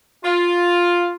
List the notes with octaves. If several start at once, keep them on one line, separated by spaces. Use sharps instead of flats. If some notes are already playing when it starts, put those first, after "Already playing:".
F4